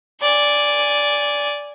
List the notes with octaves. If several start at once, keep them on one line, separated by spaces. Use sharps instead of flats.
D5 G#5